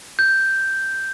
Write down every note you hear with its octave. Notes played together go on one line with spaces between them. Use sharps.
G6